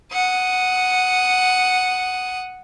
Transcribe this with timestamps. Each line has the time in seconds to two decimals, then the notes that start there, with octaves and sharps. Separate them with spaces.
0.12 F#5 D#6